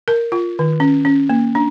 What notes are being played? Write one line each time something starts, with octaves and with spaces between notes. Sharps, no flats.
A#4
F4
D#3
C#4
C#4
A#3
D4